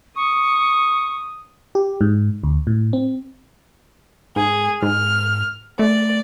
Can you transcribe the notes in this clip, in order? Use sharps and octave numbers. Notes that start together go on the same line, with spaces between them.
C#6 D#6
G4
G#2
D2
A2
C4
G#2 G#4
G#2 F6
A3 D5